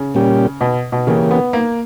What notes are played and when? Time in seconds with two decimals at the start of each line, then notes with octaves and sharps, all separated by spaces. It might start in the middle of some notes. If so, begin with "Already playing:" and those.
Already playing: C#3
0.15 A#2 G3 C#4 G4
0.61 B2
0.92 B2
1.07 C#3 E3 A#3 C#4 G4
1.31 B3
1.53 A#3